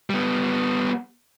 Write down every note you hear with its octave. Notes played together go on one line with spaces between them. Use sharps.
G3 B3